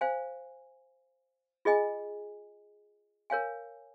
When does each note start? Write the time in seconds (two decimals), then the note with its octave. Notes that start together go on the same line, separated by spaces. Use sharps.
0.01 C5 F5 G#5
1.65 F4 G#4 D#5 G#5
3.30 A#4 C#5 F5 G#5